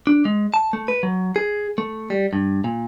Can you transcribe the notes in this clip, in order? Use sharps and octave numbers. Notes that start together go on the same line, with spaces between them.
D4
G#3
A5
A3
B4
F#3
G#4
A3
G3
G2
A#2